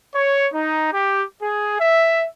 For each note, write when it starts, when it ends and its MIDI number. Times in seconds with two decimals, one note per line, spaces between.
0.14 0.47 73
0.53 0.91 63
0.93 1.23 67
1.41 1.78 68
1.79 2.25 76